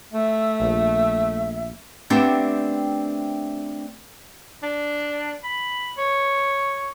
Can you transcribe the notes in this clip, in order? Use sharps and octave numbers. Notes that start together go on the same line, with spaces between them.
A3 E5
A#1
A3 B3 C4 D4 G4 G5
D4
B5
C#5